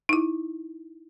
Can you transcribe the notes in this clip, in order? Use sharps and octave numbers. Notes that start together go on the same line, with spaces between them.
D#4 E4